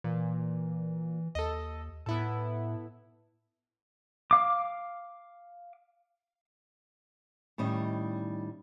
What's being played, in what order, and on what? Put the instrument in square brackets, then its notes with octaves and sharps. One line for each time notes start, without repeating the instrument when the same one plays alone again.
[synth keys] A#2 [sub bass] E3
[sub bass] D#2 [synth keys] A4 D#5
[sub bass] A2 [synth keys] B3 E4 A4
[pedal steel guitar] F5 D6
[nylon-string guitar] A2 D#3 G3 C#4 D#4